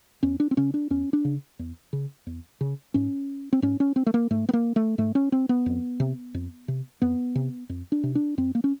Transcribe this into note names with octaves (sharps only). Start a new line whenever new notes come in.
E2 C#4
D4
C4
C#3 C#4
D4
E2 C#4
D4
C#3
E2
C#3
E2
C#3
G#2 C#4
C4
G#2 C#4
C#4
C4
A3
A#3
G#2 A3
B3
A#3
A3
G#2 A3
C#4
C4
B3
F2
C3
F2
C3
F2 B3
C3
F2
D4
C3
D4
F2 C4
A#3
C#4